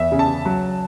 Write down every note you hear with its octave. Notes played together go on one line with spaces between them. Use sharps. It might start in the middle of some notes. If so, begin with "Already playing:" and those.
Already playing: E2 E5
C#3
A5
C#3
F#3